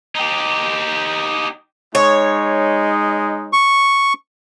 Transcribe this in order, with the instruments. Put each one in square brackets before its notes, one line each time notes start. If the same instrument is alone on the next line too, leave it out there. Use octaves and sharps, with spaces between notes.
[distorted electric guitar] D#4 G4
[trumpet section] G#3 D#4 [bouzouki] C#5
[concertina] C#6